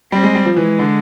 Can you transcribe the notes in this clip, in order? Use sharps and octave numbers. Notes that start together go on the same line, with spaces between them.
G3 C4
G#3
G3
F3
E3 G#3
D3